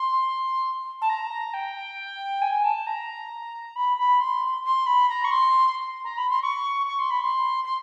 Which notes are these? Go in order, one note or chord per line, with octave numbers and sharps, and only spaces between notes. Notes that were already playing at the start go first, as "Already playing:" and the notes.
Already playing: C6
A5
A#5
G5
G#5
A5
A#5
B5
B5
C6
C6
B5
A#5
C#6
C6
A#5
B5
C6
C#6
C#6
C6
B5
C6
C6